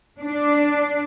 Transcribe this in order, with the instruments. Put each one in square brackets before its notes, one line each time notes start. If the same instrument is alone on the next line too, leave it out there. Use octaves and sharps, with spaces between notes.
[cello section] D4